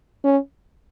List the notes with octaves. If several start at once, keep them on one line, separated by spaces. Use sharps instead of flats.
C#4